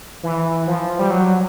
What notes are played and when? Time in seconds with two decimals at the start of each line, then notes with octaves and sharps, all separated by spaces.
0.23 E3
0.67 F3
0.99 G3
1.11 F#3